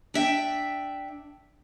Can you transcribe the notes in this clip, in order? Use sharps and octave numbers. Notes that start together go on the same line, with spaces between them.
D4 E5 G5